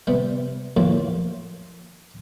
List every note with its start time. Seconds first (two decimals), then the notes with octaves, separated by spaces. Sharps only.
0.07 C3 G3 B3
0.77 F2 A2 F3 F#3 A#3